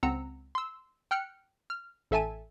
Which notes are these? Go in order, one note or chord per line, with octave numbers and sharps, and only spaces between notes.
C#2 C4 F#5 A#5 E6 C#7
C6 E6
G5 F6 F#6 C#7
F6
A1 A4 E5 G#5 A5 D#7